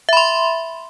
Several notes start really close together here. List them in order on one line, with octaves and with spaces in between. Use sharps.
E5 B5 C6